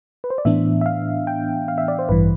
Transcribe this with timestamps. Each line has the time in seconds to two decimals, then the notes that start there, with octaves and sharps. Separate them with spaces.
0.24 B4
0.30 C5
0.38 D5
0.45 A2 E3 B3 D4 E5
0.81 E5
0.86 F5
1.27 G5
1.68 F5
1.78 E5
1.88 D5
1.99 C5
2.09 A1 G2 E3 B4